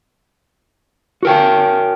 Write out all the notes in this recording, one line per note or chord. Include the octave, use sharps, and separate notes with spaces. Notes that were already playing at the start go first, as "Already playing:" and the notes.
F#4 A#4 G5